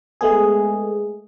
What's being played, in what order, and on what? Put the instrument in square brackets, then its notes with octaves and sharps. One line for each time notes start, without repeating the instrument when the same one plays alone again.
[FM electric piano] G#3 A3 B3 G#4